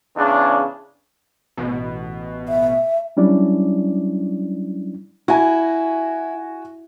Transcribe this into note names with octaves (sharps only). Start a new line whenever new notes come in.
E2 C#3 D4
A1 B2
E5
F#3 G3 C#4 D4 E4 D5
E4 F#4 G#5